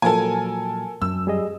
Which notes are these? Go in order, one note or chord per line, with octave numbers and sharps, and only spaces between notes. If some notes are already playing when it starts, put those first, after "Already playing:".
A#2 F3 F#3 A4 A#4 G#5
F#2 E6
G3 G#4 D#5